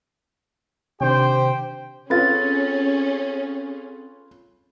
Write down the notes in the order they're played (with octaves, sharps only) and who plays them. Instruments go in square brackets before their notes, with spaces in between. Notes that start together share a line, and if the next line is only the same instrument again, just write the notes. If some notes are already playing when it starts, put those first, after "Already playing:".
[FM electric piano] C3 D#3 D4 [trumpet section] G4 C5 G5
[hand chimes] C4 A4 A6 [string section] C#4 G#4 [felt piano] F4 B4